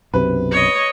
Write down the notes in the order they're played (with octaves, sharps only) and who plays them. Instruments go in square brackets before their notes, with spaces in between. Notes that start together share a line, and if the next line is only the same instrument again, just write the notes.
[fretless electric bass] B1 F#2 C3 [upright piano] B4
[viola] C#5 D#5